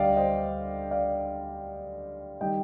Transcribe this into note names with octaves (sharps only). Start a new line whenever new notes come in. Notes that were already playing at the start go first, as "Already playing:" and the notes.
Already playing: D2 D3 G3 D5 D#5 F5 G5
C5 D#5
D5 F5
D#3 G3 D#5 G5